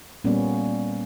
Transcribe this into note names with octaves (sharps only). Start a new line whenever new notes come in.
A#2 G3 A#3 B3 C#4